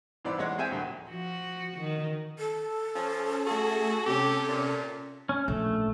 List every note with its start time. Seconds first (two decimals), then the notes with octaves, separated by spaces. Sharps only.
0.25 G#2 E3 C5 D5 B5 E6
0.39 E2 G#3 C#5 F#5
0.58 C4 G#4 C5 E5 G5 G#5
0.71 D2 A#2 F3 F#3
1.07 F3 F#4
1.79 D#3
2.39 A4
2.95 F3 C#4
3.47 A3 F#4 G#4
4.06 C3 C#4 G4
4.48 A#2
5.29 C#4
5.48 A#1 A3